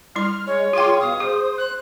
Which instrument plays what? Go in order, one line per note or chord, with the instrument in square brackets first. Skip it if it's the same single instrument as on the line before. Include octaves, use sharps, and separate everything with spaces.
[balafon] G3 E4 C6 [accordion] F6
[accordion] G#3 [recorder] C#5
[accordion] F4 C6 D6 [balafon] G#4 G5
[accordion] B2 F5 [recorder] D#6
[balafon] G#4 [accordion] C5
[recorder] F#6